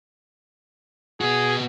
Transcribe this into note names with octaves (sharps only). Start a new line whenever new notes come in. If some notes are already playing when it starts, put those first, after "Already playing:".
B3 F#4 G#4